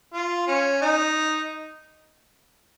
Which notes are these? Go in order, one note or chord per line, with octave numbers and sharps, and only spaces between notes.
F4
C#4
D#4